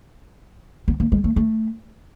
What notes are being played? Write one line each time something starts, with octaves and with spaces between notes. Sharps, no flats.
B3
A#3
G#3
A3
A3